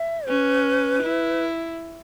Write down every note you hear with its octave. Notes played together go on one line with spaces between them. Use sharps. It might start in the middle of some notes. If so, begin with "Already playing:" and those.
Already playing: E5
C#4 B4
E4